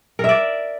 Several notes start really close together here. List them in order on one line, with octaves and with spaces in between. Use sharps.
A#4 E5 D5